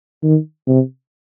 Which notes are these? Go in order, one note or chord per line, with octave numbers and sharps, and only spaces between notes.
D#3
C3